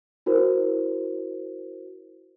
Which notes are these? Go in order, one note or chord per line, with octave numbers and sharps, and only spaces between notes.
E4 F#4 A#4 C5